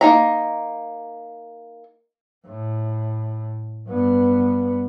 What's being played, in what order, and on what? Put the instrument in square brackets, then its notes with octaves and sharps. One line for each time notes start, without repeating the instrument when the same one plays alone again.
[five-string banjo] A#3 D#4 A#5
[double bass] A2
G2 B3